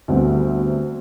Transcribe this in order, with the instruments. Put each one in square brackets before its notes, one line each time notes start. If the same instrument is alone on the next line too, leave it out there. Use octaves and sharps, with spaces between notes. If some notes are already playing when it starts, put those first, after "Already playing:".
[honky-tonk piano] D2 G2 B3 C4